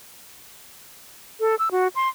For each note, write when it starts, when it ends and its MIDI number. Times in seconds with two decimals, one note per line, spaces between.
1.40 1.55 69
1.59 1.69 88
1.71 1.88 66
1.95 2.09 84